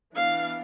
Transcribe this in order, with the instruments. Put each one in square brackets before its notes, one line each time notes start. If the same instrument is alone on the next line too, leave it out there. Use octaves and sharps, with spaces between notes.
[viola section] E3 B3 D4 F5